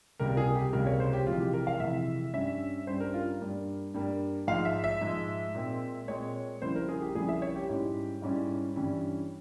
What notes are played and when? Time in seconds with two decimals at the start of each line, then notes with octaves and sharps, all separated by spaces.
0.20 C#2 C3 G3 A#3 A#4
0.37 G#4
0.55 G4
0.73 C#2 C3 G3 A#3 A#4
0.86 C#5
1.00 C5
1.13 G4
1.26 F2 C3 E3 G#3 F4
1.40 G4
1.53 A#4
1.67 F5
1.80 F2 C3 E3 G#3 E5
2.34 G2 G3 C#4 E5
2.87 G2 G3 C#4 C5
3.00 A#4
3.14 F4
3.41 G2 G3 A#3
3.94 G2 G3 A#3
4.47 G#2 F3 G#3 F5
4.65 E5
4.84 E5
5.01 G#2 F3 G#3
5.55 A#2 G#3 C4
6.08 A#2 G#3 C4 C#5
6.62 F2 C#3 G3 A#3 E4 C5
6.76 A#4
6.89 G#4
7.02 G4
7.15 F2 C#3 G3 A#3 E4 G#4
7.29 E5
7.42 C#5
7.56 G4
7.69 G#2 G3 C#4 E4
8.22 G#2 G3 C#4 E4
8.76 G2 E3 G3 C#4 E4